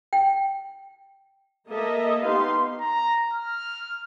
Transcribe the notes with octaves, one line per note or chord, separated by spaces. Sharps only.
G5
A#3 A4 D#5 E5
B3 D#4 G4 F5 C6
A#5
F6